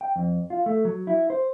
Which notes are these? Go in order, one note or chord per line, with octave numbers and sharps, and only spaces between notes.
G5
F2
F4
A3
F#3
E4
C5